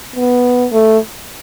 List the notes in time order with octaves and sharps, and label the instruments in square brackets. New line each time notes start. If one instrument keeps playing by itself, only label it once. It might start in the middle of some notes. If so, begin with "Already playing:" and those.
[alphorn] B3
A3